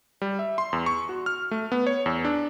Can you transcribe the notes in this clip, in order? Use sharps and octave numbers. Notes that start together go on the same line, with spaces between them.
G3
E5
C6
E2
C#6
F#4
F6
A3
B3
C#5
E2
D4